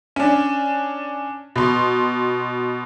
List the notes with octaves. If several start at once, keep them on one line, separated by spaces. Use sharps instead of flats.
C#4 D4
B2 C6